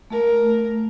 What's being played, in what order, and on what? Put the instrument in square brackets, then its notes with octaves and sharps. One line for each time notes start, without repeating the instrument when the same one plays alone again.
[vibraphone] A3 [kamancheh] A#4